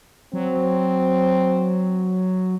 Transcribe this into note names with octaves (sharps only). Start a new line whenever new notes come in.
F#3 C4